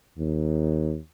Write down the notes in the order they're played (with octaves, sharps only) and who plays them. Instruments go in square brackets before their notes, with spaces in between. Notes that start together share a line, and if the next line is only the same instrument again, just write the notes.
[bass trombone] D#2